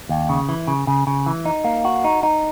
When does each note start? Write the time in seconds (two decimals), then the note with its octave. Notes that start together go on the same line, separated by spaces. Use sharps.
0.09 D#2
0.29 C#3
0.49 E3
0.67 C#3
0.87 C#3
1.07 C#3
1.26 E3
1.45 D#4
1.64 A#3
1.85 F#4
2.04 D#4
2.23 D#4